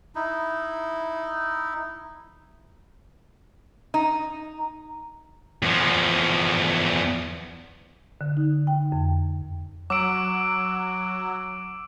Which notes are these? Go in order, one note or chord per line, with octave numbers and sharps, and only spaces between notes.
D#4 E4
D#4
E2 F3
D3
D#4
G5
F2
F#3 D6 E6 D7